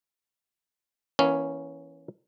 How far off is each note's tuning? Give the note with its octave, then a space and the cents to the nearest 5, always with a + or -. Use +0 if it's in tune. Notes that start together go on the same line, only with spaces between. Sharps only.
E3 +0 A#3 +35 C#4 +0